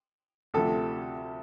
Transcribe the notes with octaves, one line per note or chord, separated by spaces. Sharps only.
D2 C3 F3 A4